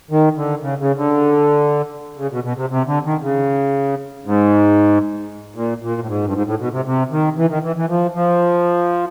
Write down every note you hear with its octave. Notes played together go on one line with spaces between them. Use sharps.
D#3
D3
C#3
C#3
D3
C#3
B2
B2
C3
C3
D3
D#3
C#3
G#2
A#2
A#2
A2
G#2
G2
G#2
A2
B2
C3
C3
D#3
E3
D#3
E3
E3
F3
F3